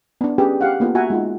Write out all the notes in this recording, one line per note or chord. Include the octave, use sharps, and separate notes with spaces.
B3 D4
C#4 G4 G#4 B4 G5
G4 F5 F#5
A#3 B3 F4 A4
F#4 E5 F#5 G#5 A#5
G#3 D#4 F4